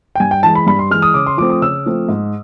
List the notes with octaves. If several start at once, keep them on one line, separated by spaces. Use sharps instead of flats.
G5
G2 G#5
G5
E3 G#3 A5
B5
G2 B5
C6
E3 G#3 F6
D#6
C#3 D6
C6
F3 A3 C4 D6
D#6
C#3 E6
F3 A3 C4
G#2